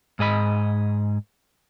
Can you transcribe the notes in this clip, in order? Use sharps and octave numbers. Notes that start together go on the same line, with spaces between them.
G#2 G#4 D#5 B5